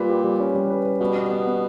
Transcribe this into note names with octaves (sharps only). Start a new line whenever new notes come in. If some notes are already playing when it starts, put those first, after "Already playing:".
Already playing: A#2 G3 B4
G4
G3
C#4
G3
B4
B4
B2 G3
B3
B3
B3